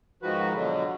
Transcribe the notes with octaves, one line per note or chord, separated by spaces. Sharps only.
G#2 D#3 F3 F#4 B4
B2 D3 F#3